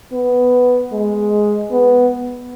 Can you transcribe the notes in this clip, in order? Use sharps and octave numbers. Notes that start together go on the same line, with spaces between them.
B3
G#3
B3